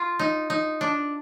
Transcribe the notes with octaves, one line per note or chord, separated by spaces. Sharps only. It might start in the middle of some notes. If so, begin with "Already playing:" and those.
Already playing: F4
D#4
D#4
D4